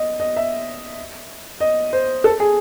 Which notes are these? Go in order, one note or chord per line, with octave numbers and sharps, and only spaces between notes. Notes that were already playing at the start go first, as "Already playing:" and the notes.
Already playing: D#5
D#5
E5
D#5
C5
A4
G#4